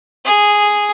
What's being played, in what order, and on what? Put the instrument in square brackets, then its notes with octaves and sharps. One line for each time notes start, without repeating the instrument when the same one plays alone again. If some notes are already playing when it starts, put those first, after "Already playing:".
[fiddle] G#4